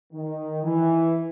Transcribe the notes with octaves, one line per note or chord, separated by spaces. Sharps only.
D#3
E3